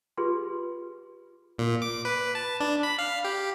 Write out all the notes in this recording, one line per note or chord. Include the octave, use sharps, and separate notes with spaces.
F4 G4 G#4 B4 C6
A#2
D6
B4
A5
D4
B5
F5
G4